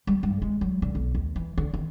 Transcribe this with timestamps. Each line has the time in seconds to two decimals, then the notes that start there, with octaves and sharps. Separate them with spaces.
0.07 G3
0.23 G2
0.42 G#3
0.61 F#3
0.82 D3
0.95 B1
1.15 D#2
1.36 E3
1.58 D3
1.74 D#3